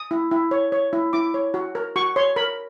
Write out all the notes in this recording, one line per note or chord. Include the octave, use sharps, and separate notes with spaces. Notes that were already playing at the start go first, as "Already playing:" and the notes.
Already playing: D#6
E4
E4
C#5
C#5
E4
E4 D6
C#5
F#4
A#4
F#4 C#6
C#5 C6
A#4 B5